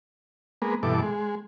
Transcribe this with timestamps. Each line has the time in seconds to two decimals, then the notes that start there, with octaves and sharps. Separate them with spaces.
0.62 G#3 A#3 B3
0.83 G2 B2 E3 A4 D6
1.02 G#3